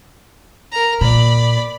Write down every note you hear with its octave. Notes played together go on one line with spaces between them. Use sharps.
A#4 A#5
A#2 D5 B5